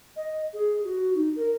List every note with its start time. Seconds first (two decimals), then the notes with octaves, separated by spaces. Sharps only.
0.16 D#5
0.54 G#4
0.84 F#4
1.15 D#4
1.36 A#4